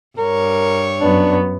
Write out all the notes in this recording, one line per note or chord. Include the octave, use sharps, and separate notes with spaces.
G2 A#4 C#5
F#2 B3 D4